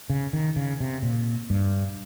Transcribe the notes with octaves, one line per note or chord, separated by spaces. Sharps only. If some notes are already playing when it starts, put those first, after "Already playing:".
C#3
D#3
C#3
C3
A#2
G2